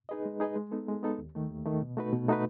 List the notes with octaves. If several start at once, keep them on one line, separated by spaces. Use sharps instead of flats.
D#4 G#4 B4 D#5
G#3
D#4 G#4 B4 D#5
G#3
B3 D#4 A4
G#3
B3 D#4 A4
D#2
D#3 A3
D#2
D#3 A3
B2
A3 D#4 F#4 B4
B2
A3 D#4 F#4 B4